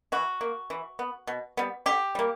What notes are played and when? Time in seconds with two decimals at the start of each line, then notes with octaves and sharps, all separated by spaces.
0.12 E3 F#4
0.41 A#3
0.70 E3
0.99 B3
1.27 B2
1.57 G3 B3
1.86 D3 G4
2.15 G3 A#3